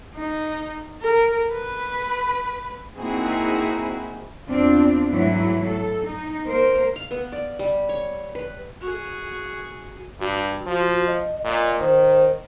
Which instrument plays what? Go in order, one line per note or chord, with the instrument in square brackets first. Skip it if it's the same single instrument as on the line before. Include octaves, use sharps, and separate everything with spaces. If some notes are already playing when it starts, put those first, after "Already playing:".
[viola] D#4
A#4
B4
[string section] A#3 C4 D#4 E4 F#4 G#4
[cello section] E2 C4 D4 F4
G#2 E3 F#3 A3 E4
A4
D#4
A#3 A#4 C5
[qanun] F5
B3
D5
G3
C#5
B4
[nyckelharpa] F#4 G#4
[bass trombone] G2 [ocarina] F#4
[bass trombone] F3
[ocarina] D#5
[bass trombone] A#2 [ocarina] D#5
[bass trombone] D#3 [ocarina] C5